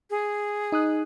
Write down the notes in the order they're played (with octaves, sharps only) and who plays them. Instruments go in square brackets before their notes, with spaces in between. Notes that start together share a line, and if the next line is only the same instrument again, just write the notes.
[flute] G#4
[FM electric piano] D#4 D#6 F#6